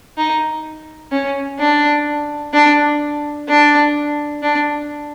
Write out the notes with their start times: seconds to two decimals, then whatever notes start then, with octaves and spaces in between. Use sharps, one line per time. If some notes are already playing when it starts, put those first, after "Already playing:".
0.17 D#4
1.12 C#4
1.59 D4
2.53 D4
3.48 D4
4.43 D4